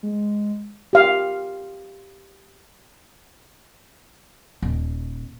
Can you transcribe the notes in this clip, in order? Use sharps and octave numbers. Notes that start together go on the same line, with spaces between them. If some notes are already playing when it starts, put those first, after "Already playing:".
G#3
G4 F5
D#1